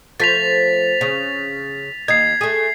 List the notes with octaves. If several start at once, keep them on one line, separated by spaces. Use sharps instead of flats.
F3 A3 A6 B6 F7
C#3
D#2 D#4 G#6 C7
A3 G#4